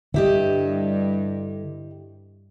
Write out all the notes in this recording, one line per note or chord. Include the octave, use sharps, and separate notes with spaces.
G2 D3 G3 E4 G4 D#5